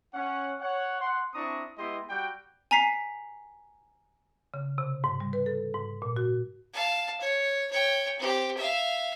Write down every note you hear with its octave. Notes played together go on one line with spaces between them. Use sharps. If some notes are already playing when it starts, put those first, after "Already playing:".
C#4 F#5
C#5 F#5
F#5 C6
C4 D4 E4 A#5 C#6 D#6
G#3 B3 E4 G4 D#5 C6
G3 F#4 F#5 G5
G#5 A#5 B6 C7
C#3
C3
G#2
G3
B4
A4
G#2
A#2
F#4
F5 A5
C#5
C#5 G5
C4 G4
E5 F5